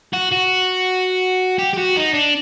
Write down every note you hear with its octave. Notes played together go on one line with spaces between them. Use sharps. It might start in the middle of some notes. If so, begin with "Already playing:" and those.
F#4
F#4
G4
G4
F#4
D#4
D4